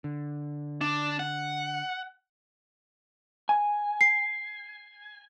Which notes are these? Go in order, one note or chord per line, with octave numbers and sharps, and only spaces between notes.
D3
D4
F#5
G#5
C7